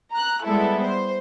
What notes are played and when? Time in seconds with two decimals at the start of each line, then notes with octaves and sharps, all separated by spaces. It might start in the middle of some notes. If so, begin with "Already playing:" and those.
0.13 A#5 F#6
0.45 G3 G#3 B3 E4 A4
0.85 C5